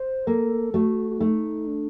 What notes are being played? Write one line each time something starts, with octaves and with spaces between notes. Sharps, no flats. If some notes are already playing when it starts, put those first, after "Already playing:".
Already playing: C5
A#3 A4
A3 F#4
F#4
A3 D#4
D4